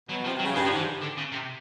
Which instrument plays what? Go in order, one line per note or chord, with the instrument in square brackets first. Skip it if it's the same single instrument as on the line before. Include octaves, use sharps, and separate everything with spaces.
[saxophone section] B2 [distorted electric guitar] F#3
[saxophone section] C3 [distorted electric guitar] F3
[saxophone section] C3 [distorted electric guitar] F#3
[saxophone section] C#3
[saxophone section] G2 [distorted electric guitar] G#3
[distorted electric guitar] F3
[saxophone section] G#2
[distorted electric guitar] E3
D3
C#3
C3